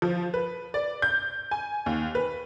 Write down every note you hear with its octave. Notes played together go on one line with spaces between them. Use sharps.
F3
B4
D5
G6
G#5
D#2
B4